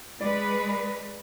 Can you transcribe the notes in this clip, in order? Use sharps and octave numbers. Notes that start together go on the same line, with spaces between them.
G#3 B4 D5